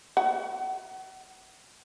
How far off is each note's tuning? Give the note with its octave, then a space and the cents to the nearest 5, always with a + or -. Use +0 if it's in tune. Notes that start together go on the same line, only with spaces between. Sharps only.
F#5 +40